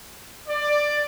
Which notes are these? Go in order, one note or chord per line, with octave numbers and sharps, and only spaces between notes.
D5